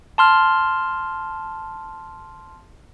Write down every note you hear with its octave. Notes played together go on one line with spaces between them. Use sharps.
A5 C6 F6